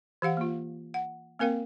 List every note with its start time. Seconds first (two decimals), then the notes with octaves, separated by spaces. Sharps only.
0.22 E3 G4 F5 F#5
0.37 A#3 F4
0.94 F#5
1.39 A#3 C4 A#4 F5 G5